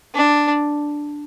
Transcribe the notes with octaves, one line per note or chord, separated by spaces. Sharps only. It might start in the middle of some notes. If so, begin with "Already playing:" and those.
D4